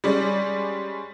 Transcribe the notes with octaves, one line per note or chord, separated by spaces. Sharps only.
G3 G#3 C#4 D5